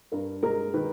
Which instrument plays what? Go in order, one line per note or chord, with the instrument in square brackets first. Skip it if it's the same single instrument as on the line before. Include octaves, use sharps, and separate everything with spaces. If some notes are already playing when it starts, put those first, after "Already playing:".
[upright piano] G2 A#4
G#3 A#4
D#3 B4